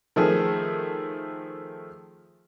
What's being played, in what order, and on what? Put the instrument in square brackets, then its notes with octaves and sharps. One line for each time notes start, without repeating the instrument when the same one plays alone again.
[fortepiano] D#3 F3 A3 G#4